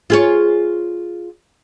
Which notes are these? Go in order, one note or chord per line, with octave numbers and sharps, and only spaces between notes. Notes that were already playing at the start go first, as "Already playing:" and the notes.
F4 G#4 C#5